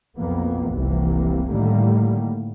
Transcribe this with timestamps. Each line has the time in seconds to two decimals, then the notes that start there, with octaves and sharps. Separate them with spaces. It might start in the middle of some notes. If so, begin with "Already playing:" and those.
0.18 B1 F2 B2 A#3 B3
0.72 F1 C2 C3 E3 A#3
1.49 A2 D3 D#3 G3 A#3